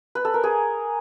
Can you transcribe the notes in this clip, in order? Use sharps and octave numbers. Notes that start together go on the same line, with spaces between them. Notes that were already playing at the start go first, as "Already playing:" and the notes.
B4
A4
A#4
G#4